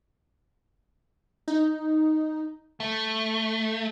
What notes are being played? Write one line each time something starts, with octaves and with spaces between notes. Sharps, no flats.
D#4
A3